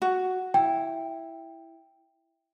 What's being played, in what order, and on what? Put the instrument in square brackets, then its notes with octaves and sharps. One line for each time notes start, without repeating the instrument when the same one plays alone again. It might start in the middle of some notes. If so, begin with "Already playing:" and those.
[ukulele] F#4
[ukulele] E4 [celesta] G5